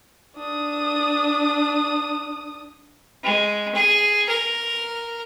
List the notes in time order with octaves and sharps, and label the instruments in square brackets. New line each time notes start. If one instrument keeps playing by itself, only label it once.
[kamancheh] D4 D#6
[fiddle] G#3
G#4
A#4